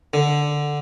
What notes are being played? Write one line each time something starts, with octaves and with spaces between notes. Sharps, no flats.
D3